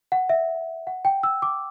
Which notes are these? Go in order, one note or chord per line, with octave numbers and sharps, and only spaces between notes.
F#5
E5
F#5
G5
E6
D6